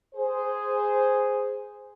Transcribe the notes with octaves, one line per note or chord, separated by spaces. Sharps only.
G#4 C5